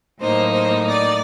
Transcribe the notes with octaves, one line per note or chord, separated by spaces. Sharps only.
A2 F#3 A#3 D#4 C5
C5
D5